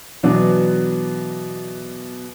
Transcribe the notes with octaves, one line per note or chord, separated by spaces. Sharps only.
B2 E3 F#3 B3 D4